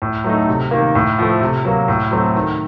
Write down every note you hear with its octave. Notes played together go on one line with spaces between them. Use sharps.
A2
F#3 A3 D#4
C3
D#3 A#3
A2
F3 A3
C3
F#3 A#3
A2
F#3 A3 C4
D#3